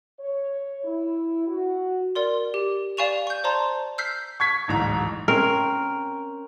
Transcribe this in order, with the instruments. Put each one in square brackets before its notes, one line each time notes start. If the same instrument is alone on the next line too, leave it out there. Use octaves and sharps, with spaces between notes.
[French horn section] C#5
E4
F#4
[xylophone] A#4 D5 C6
G4
D5 F5 G#5 C#6 E7 F7
C#6 G6
C5 D5 A5 A#5 C6
E6 F6 G6 B6 C7
[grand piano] C#6 G#6 B6
D1 A1 G#2 A#5
[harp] C4 C#4 [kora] A#4